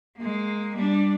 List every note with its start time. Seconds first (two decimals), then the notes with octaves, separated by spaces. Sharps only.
0.17 G#3 A#3
0.76 G3 D4